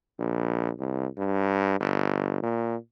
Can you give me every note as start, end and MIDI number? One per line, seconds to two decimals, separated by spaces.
0.19 0.71 34
0.79 1.07 36
1.18 1.80 43
1.80 2.39 31
2.43 2.76 46